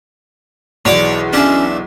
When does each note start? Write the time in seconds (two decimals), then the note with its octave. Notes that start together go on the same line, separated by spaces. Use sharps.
0.85 B1 E2 C#5 D5 D6
1.33 C#4 D4 E5